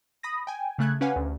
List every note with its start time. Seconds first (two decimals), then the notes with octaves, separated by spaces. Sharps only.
0.23 B5 D#6 A#6
0.47 G5 G#5
0.78 C#3 A3 F#6 G#6
1.01 C#4 G4 B4 F5 F#5 G#5
1.16 D2